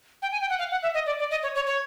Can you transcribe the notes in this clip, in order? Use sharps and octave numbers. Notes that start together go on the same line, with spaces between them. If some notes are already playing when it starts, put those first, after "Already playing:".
G5
G#5
G5
F#5
F5
F#5
E5
D#5
D5
D5
D#5
C#5
C#5
C#5